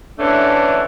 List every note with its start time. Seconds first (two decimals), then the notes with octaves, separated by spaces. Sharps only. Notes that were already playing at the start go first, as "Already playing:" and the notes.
0.18 D3 E3 A3 C#4 D4